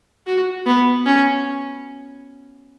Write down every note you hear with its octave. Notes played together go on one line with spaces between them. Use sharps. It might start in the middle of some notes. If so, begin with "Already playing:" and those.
F#4
B3
C#4